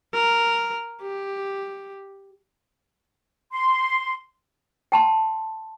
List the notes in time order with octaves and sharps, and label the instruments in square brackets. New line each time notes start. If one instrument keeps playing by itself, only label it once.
[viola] A#4
G4
[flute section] C6
[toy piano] G5 A5 C6